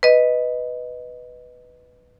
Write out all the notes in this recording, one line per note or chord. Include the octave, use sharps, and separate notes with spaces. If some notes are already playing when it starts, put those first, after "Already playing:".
B4 D#5